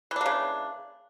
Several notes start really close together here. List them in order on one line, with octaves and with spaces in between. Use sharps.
E3 D4 A#3 C#3